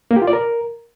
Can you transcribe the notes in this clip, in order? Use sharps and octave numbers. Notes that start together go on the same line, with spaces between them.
A#3
G4
F4
D5
A#4